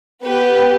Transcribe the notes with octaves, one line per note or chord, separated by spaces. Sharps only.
B3 G4 B4